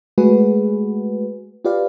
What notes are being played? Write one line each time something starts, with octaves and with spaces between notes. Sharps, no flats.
G#3 A3 F#4 G#4 B4
F4 G4 B4 D5 F5